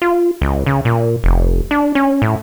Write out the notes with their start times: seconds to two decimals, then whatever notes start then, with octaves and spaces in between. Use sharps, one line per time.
0.02 F4
0.42 C#2
0.66 C#3
0.85 A#2
1.24 F1
1.71 D4
1.95 C#4
2.22 A2